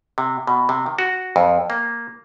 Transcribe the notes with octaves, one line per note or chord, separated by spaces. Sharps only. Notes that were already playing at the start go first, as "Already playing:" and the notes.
C3
B2
C3
D#3
F#4
F2
A#3